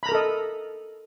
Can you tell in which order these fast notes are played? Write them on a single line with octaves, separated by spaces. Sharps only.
B5 A#5 A#4 A4 D#5